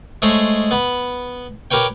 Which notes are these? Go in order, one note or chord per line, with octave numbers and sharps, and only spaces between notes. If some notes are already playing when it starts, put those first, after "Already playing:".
G#3 A3 C5 C#5 D#5
B3 B5
G4 A#4 B4 C#5 G5